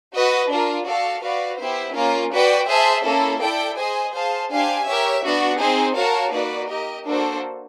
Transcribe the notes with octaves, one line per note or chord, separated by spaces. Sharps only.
F#4 B4 D#5
D4 F4 A#4
F#4 A4 D5 F5
F#4 B4 D5 F5
B3 E4 G4 C5
A#3 C#4 F4 A#4
F#4 B4 D5 G5
G#4 C5 E5 A5
A#3 C#4 E4 A4
E4 A4 D5 G5
G#4 C5 D#5 G#5
G#4 C5 F5 A5
D4 G4 C5 F5 G#5
G4 A#4 C#5 E5
B3 D4 F#4
C4 D#4 G#4 C5
F#4 A#4 C#5 F5 A5
A#3 D#4 F#4 B4 D5
G4 A#4 D#5
A#3 D4 F#4 A4 C5